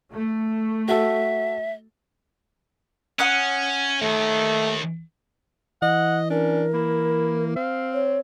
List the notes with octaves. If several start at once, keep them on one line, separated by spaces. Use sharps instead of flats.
A3
F#4 A4 E5
C#4 F#5 D#6 F#6
D#2 D#3 A3
E3 D#5 F#5
C#4 D4 A#4
A#3 E4
C4 F5
C#5